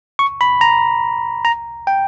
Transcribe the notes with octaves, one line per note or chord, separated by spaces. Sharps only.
C#6
B5
A#5
A#5
G5